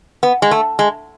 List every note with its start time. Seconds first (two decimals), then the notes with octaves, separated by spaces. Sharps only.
0.23 B3
0.42 G#3
0.51 A3
0.79 G#3